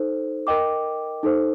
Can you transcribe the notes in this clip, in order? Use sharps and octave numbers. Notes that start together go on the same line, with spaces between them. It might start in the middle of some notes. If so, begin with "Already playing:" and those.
Already playing: D#4 A4 C5
A#4 D#5 G5 D6
D#4 A4 C5